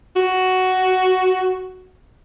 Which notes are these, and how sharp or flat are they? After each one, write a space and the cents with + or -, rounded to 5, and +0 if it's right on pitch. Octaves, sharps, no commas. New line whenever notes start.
F#4 +5